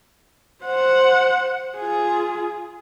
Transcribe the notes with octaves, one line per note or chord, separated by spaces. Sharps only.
C5 F#5
F4 G#4